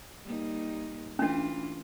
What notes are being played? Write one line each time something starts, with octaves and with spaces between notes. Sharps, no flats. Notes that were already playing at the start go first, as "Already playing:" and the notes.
G3 A#3 D#4
E3 A3 C#4 D4 F4